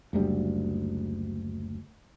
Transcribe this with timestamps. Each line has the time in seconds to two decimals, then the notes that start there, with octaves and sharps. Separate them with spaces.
0.13 F#1 D2 G3